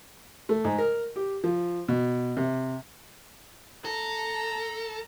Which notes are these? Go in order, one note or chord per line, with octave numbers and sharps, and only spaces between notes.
A3
G#2
A#4
G4
F3
B2
C3
A4 A#5